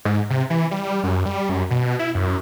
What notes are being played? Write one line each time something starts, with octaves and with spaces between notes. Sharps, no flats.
G#2
C3
E3
G3
F#2
G3
F#2
B2
E4
F#2